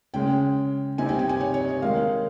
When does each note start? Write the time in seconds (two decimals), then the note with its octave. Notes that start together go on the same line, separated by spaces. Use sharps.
0.14 C#3 G#3 C#4 G5
0.98 C3 G3 C4 D#4 G#5
1.09 G5
1.19 G#5
1.29 G#5
1.40 C#5
1.54 C#5
1.69 D#5
1.82 D#3 G#3 D#4 F5